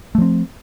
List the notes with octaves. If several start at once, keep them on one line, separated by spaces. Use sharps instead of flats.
F3 A3 C4